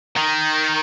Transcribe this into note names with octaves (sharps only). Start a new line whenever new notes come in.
D#3